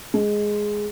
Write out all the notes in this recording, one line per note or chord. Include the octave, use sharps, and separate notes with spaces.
G#3